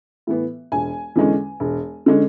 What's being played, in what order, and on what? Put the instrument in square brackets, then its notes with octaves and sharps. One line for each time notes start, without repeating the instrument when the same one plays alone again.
[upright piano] A2 E3 B3
E1 G#5
E2 D3 G#3 C#4
E1
D3 G#3 C#4